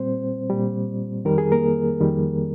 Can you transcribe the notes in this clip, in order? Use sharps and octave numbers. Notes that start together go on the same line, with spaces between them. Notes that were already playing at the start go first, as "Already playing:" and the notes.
Already playing: A#2 G3 C4 C5
A#2 G3
F2 D#3 G3 A#4
G#4
A#3 A#4
F2 D#3 G3